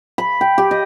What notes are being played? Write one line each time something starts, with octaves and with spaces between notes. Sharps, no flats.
B5
G5
G4
D#5